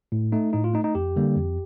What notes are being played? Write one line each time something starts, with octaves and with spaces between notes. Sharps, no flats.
A2
A3 D#4
A2 D#4
F4
A3 D#4
D#4
F2 G4
D3 G3 A#3
F2